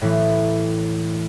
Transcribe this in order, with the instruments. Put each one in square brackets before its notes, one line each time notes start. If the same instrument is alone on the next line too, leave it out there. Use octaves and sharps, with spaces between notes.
[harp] A2 E3